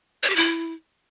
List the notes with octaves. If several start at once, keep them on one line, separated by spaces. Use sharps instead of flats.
C#5
G4
E4